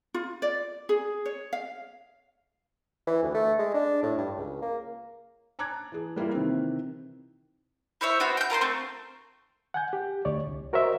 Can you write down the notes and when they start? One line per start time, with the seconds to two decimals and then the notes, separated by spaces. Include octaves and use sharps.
0.14 F4
0.42 D5
0.89 G#4
1.25 C#5
1.53 F5
3.07 E3
3.23 D2
3.34 A3
3.59 G#3
3.74 D4
4.03 A2
4.18 G2
4.37 C#2
4.62 A#3
5.59 A5 A#5 D6 F#6 G#6
5.92 E3 G#4
6.16 G3 A#3 E4 F4
6.32 C3 D#3 E3 C4
8.01 E4 C5 C#5 E5
8.20 B3 F#4 C5 G5
8.37 G5 G6
8.50 F4 A#4 C5 C6
8.61 A3 C4
9.74 F#5 G#5 G6
9.93 G4
10.25 D2 C#5 D5
10.47 C2
10.73 F#4 A#4 C5 C#5 D#5 E5